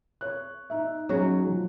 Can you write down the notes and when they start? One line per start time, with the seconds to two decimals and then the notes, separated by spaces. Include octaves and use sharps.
0.21 C#5 F#6
0.70 D#4 E5
1.09 F#3 C#4 D#4 F#4 G#4
1.47 F3